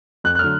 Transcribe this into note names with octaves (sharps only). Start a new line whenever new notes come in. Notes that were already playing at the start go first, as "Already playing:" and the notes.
F2 F#6
F#6
D3 F#3 A3 F6